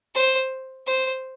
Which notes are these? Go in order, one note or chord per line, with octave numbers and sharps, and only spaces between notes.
C5
C5